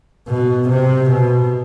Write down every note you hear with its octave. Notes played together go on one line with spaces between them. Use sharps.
B2
C3
B2